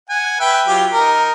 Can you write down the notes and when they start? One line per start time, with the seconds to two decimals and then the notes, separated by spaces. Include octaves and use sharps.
0.10 F#5 G#5
0.40 B4 E5 G5
0.67 F#3 F4 G4
0.93 D#4 A#4